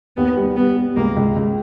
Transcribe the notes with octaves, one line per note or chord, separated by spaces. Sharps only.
D#2 B3
G3
G3 B3
G3
C#2 A#3
C#2
C#2